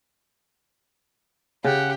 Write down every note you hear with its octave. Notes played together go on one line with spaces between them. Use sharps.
C#3 G4 F#5